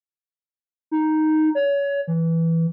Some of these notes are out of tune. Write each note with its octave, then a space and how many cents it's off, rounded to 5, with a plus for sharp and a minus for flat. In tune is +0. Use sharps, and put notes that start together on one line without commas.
D#4 +0
C#5 +25
E3 +0